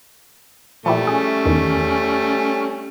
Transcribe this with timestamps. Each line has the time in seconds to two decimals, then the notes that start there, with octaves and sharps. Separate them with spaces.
0.86 A#2 F3 G3 A3 E4 G4
1.07 C#4 G#4
1.45 E2 D#3